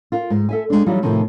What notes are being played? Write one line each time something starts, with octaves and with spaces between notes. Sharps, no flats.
F4 A#4
G#2
A4 E5 G#5
G#3 D4
E3 F#3 G3 D#4 F4
A2 C3 D#3 F3 A3